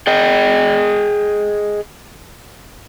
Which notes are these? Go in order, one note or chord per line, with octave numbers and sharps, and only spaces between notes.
G#4 D#5 G5